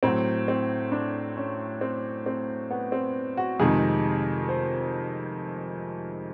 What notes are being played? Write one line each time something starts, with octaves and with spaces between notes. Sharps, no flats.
A2 F#3 C4
C4
D4
C#4
C4
C4
B3
C4
F#4
F2 C3 D#3 G#3 G#4
C5